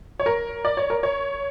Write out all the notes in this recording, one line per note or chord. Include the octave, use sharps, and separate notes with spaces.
C#5
A#4
D5
C#5
A#4
C#5